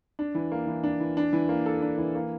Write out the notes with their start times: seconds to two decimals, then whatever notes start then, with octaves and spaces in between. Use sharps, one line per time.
0.19 D4
0.35 E3
0.52 A#3
0.67 E3
0.83 D4
1.00 E3
1.17 D4
1.33 E3
1.49 A#3
1.66 A4
1.82 D4
1.98 E3
2.15 A#3